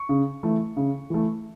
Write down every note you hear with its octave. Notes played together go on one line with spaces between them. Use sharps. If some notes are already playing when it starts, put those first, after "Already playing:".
Already playing: C#6
C#3
E3 A3
C#3
E3 A3